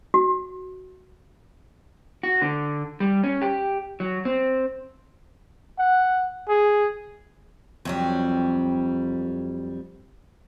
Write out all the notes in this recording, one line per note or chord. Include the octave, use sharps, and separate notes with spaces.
F#4
F#4
D3
G3
C#4
G4
F#3
C4
F#5
G#4
F2 F#3 G3